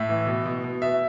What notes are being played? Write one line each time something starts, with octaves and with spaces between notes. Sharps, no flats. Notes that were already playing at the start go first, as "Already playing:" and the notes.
Already playing: A2 E5
E3
B2
B2
B2
B2 E5